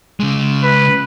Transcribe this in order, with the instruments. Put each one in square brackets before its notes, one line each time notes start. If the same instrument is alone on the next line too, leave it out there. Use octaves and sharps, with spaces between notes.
[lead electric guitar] C#3 G#3
[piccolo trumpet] B4